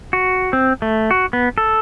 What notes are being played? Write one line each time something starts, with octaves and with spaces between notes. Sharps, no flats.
F#4
C4
A3
F#4
B3
A4